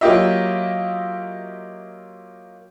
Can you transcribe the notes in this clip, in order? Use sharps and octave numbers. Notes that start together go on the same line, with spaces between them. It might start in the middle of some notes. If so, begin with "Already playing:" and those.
F#3 A#3 F4 G4 D#5 E5